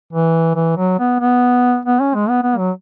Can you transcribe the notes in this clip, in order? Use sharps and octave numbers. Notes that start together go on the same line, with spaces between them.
E3
E3
F#3
B3
B3
B3
C#4
G#3
B3
B3
F#3